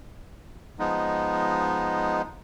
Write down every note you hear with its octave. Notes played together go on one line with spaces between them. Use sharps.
F3 G#3 B3 D#4